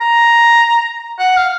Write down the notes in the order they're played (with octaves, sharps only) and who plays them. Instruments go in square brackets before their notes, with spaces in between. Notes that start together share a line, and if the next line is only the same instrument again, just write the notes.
[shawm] A#5
F#5
F5